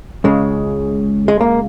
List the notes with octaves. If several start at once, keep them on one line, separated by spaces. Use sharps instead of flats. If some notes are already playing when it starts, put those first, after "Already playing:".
C#2 C#3 G#3
G#3
A#3